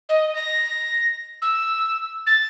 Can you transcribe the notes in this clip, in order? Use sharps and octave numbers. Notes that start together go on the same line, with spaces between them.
D#5
A#6
E6
A6